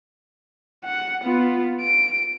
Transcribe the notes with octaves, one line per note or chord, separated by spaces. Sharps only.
F#5
B3 F4
D7